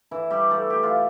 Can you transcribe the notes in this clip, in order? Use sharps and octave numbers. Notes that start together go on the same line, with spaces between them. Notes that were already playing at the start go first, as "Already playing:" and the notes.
E3 E4
G3 G4
A3 A4
G4
F4